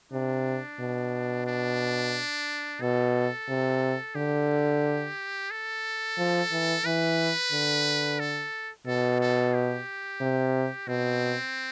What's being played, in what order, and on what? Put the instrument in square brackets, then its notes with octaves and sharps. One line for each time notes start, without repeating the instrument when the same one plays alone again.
[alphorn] C3 [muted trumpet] D4
[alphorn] B2
[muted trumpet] D4
[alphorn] B2 [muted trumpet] A4
[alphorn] C3
[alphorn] D3 [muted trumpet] G4
[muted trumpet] A4
[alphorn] F3
E3
[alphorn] E3 [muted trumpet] B4
[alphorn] D3
[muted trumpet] A4
[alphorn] B2 [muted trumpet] A4
[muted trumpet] A4
G4
[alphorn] C3
[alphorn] B2 [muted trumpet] C4